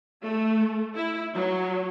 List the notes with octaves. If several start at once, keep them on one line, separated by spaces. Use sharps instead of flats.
A3
E4
F#3